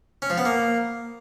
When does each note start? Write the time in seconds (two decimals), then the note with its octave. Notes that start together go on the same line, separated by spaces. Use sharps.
0.22 C#4
0.30 F3
0.38 B3
0.45 A#3